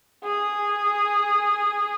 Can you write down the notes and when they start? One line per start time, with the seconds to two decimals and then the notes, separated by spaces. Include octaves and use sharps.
0.24 G#4